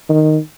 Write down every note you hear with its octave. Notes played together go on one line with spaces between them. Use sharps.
D#3